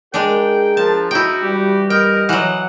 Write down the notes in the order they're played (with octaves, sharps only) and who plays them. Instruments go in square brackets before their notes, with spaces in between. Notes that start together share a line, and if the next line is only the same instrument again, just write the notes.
[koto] G#3 D4 [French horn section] G#4 A#4 [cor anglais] G5
[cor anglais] F3 [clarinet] D4 [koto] A5
[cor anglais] D#4 [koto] E4 G5 [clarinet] F#4
[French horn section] E3 G3 [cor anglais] G4
[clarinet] A#4 [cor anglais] D#5 [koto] G5
[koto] E3 F#3 [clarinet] F#5